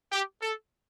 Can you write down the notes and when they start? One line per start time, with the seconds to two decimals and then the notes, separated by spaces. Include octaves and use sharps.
0.12 G4
0.42 A4